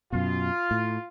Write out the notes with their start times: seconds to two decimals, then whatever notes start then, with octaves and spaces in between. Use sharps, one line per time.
0.13 F#2 B2 F4
0.71 A2